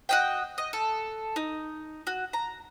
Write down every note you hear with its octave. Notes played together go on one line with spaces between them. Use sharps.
F#4 D#5 G5
D#5
A4
D#4
F#4
A#5